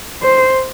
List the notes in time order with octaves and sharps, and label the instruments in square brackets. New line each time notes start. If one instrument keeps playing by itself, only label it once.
[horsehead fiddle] C5